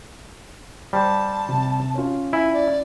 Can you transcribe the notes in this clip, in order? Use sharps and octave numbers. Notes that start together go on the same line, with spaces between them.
G3 C5 A5 C6
C3
C#4 F4
E4 G#5
D5